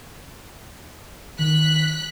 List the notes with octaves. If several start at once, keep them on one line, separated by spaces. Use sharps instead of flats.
D#3 F#6 B6